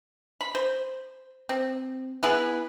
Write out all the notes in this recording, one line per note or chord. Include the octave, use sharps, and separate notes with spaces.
B5
C5
C4
B3 E4 G#4 B4